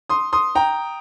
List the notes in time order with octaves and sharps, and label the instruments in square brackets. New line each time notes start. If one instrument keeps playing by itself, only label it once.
[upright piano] C6 D#6
C6 D#6
G5 A#5